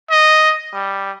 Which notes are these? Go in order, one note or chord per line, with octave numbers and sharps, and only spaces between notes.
D#5
G3